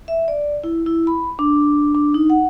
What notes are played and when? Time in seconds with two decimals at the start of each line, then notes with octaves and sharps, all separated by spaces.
0.08 E5
0.28 D5
0.64 E4
0.86 E4
1.07 B5
1.39 D4
1.95 D4
2.14 D#4
2.30 F#5